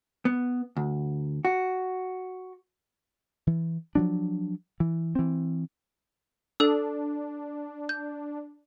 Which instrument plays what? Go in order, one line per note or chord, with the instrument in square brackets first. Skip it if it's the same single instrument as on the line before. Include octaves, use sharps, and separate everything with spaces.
[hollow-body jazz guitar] B3
D2
F#4
[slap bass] E3
F3 F#3 D4
E3
E3 C4
[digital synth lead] D4 [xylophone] A4 E6
[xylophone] G6